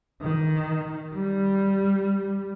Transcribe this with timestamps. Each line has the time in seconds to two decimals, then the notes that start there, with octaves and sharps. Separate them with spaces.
0.21 D#3
1.14 G3